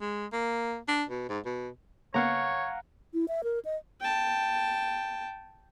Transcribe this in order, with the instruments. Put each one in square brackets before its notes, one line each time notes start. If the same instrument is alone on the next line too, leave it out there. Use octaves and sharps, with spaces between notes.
[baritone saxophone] G#3
A#3
D4
B2
G#2
B2
[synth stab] C#3 A#3 B3 [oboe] C#5 [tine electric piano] F5 F#5 A#5
[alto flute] E4
E5
A#4
D#5
[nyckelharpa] G5 A5